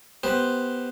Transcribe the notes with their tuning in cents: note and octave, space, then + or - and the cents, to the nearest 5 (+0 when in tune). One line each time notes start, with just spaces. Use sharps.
B3 +0 G4 +0 C5 +0